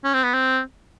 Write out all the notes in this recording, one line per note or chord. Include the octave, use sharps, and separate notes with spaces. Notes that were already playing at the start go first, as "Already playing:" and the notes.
C#4
C4
B3
C4